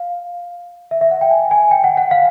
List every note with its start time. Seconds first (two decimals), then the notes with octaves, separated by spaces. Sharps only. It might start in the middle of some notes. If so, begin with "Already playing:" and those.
Already playing: F5
0.91 E5
1.01 E5
1.11 F#5
1.21 G5
1.31 G#5
1.51 G#5
1.71 G5
1.84 F#5
1.97 F#5
2.11 F5